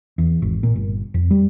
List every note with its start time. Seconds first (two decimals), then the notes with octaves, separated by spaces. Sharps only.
0.18 E2
0.42 G#1
0.63 A#2
0.76 G1
1.14 F2
1.31 G3